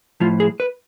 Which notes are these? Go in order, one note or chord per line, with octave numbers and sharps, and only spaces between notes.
A2 F3 F4
G#4
B4